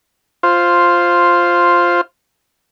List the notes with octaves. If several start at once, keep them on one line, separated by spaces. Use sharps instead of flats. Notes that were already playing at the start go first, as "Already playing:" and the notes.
F4 C5